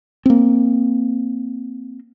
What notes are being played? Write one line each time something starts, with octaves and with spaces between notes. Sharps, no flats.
A#3 C4